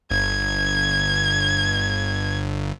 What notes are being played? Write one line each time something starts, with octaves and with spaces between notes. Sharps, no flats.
G1 G#6